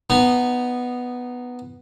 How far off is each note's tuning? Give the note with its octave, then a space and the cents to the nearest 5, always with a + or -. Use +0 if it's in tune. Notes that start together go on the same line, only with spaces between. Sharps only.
B3 +0 D#4 -20